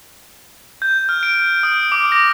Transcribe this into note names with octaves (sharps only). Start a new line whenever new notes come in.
G6
F6
D7
D#6
D6
A#6